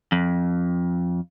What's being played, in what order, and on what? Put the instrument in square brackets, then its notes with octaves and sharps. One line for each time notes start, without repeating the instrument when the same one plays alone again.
[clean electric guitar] F2